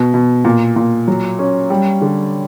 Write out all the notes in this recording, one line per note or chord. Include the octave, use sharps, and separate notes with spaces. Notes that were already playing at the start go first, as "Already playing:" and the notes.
Already playing: B2
B2
A#2
A#2
F#3
C#4
G3
D3